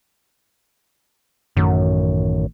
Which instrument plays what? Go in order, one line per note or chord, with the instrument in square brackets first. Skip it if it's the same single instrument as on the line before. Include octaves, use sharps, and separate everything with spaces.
[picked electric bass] A1 D#3 A3 [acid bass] F#2